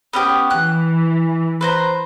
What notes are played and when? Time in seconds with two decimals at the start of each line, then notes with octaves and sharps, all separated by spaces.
0.13 B3 C#4 G4
0.50 E3 F#6
1.61 B4 C5 A#5